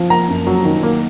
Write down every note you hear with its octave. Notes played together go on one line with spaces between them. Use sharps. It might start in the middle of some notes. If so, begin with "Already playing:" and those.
Already playing: F3
A#3 A#5
F#2
F#3
D#3
A#3